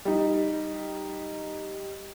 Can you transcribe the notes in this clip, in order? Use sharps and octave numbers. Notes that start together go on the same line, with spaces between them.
G3 D#4